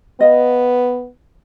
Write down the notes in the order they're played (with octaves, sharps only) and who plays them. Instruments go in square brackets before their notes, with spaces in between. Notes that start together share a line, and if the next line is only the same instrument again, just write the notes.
[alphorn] B3 [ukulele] D#5 F5